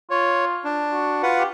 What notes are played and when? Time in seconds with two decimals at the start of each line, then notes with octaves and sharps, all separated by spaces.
0.11 F4 C#5
0.65 D4
0.93 F#4
1.23 F4 B4 F#5
1.38 G4